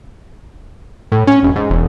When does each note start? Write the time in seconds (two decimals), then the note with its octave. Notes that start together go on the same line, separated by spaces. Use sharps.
1.12 A2
1.27 C#4
1.43 E1
1.56 G#2
1.70 E1